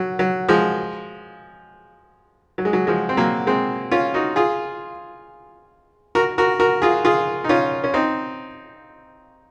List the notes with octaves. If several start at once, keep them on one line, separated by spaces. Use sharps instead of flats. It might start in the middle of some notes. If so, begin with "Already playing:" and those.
Already playing: F#3
F#3
F3 G#3
F#3
G#3
F#3
F3 G#3
C4
F#3 A#3
G#3 C4
C#4 F4
D#4 F#4
F4 G#4
F#4 A#4
F#4 A#4
F#4 A#4
F4 G#4
F4 G#4
D#4
C#4 F4
C#4
C4 D#4